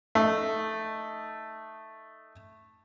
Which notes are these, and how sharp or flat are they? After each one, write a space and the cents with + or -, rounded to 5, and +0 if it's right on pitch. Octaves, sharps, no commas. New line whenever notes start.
A3 +0 D#4 +0